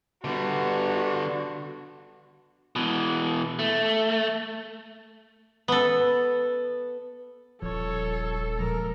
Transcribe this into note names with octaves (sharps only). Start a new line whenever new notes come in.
D3 G3 B3 D4 F#4
B2 E3
A3
B3 A4
D#1 F3 A4 C#5
A#2 F3 G#3 A#4 A#5